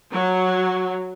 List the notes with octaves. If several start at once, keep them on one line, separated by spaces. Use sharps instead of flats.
F#3